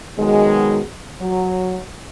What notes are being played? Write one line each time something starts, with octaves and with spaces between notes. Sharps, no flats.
B2 D#3 F#3 G#3
F#3